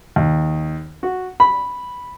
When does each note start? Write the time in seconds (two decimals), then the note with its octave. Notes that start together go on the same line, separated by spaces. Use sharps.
0.16 D#2
1.03 F#4
1.40 B5